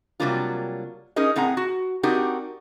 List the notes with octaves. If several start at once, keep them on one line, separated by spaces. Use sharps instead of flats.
C3 F#3 G3 A#3 D4 F4
C#4 D#4 G#4 A#4 D#5
A2 C4 G#4 F#5 A#5
F#4
C4 D4 D#4 F#4 G4 A#4